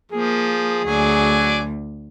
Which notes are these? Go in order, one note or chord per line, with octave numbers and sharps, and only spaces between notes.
F3 A#3 G#4
D2 F#3 D5 G#5